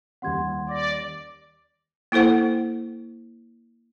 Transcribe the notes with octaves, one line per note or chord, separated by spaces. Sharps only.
D#2 G3 C#4 F#5 C6 G#6
D5 D6 A#6
A#3 E4 A4 C5 F#5